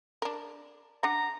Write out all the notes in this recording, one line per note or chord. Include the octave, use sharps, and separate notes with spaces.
D4 A#4
D4 F#5 A#5